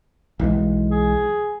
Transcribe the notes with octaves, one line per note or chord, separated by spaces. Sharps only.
B1 E3 G#3
G#4